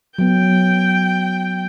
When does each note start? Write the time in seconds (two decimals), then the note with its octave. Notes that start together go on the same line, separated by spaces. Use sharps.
0.18 F#3 B3 G5